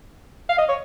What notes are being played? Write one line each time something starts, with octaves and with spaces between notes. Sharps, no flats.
F5
D#5
C#5